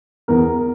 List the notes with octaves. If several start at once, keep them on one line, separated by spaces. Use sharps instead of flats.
E2 A#4